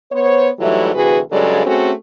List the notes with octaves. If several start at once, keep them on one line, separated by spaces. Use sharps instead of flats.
B3 C5 C#5
G#2 E3 F#3 G3 A3 E4
D2 C3 E3 F#4 G#4 B4
G2 C#3 F#3 G#3 A4 D5
A3 C4 C#4 F#4 G#4 A4